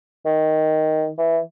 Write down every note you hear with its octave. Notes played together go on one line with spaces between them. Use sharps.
D#3
E3